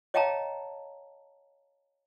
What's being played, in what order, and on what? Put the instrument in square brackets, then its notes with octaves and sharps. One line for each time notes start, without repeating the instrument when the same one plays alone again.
[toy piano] C#5 D#5 F5 G5 A5 A#5